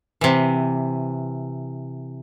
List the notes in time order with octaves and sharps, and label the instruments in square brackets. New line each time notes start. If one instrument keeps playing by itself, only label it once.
[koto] C3 E3